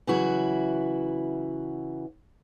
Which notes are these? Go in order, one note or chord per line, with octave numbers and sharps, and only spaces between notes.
C#3 E3 F#3 E4 F#4